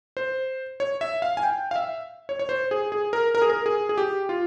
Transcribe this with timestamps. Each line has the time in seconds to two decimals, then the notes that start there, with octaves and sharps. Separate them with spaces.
0.17 C5
0.80 C#5
1.01 E5
1.22 F5
1.37 G#5
1.43 G5
1.71 F5
1.76 E5
2.29 C#5
2.39 C#5
2.49 C5
2.71 G#4
2.92 G#4
3.13 A#4
3.35 A#4
3.42 G#4
3.50 A#4
3.66 G#4
3.89 G#4
3.98 G4
4.29 F4